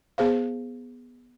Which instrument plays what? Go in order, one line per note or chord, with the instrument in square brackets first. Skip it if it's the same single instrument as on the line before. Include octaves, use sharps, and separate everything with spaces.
[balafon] B3 G#4 C5 F5